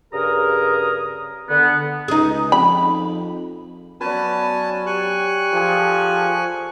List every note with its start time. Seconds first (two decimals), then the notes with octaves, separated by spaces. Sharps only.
0.14 G2 C#3 G#4 A#4 A#5 D#6
1.50 D3 B3
2.08 C#2 D#4 G#4
2.52 F2 B5
4.01 F#3 B3 C#4 B4 D5 G#5 A5
4.86 G4 G#5 C#6 F#6
5.53 F3 G#4 A4